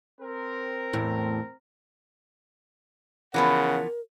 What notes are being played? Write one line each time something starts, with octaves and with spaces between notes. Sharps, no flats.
C4 A#4
E2 A2
C#3 E3 F3 B3 A#4 F#5